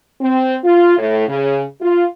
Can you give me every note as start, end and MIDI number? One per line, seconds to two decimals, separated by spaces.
0.21 0.57 60
0.64 0.98 65
0.98 1.27 45
1.28 1.64 49
1.81 2.05 65